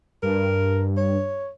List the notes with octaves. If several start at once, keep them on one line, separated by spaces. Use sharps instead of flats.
G2 A#4
C#5